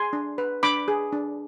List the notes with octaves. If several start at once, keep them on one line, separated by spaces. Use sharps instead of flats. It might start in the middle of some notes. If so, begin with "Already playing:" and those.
Already playing: G#4 G#5 C6
D4
B4
D4 B5 D6
G#4
D4